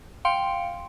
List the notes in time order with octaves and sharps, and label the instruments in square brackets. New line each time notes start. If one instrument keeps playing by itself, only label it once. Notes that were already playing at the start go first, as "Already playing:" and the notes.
[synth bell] F5 G5 C6 C#7 D7